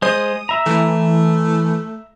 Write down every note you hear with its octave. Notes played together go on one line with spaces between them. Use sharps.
G#3 C5 D#6
E5 A#5
E3 A3